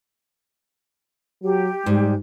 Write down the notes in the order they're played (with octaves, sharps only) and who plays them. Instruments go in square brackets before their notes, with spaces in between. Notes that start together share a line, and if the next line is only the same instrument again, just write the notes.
[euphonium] F#3 [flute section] G4
[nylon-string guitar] G#2 [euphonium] G3